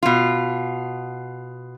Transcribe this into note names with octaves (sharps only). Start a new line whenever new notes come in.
B2 F4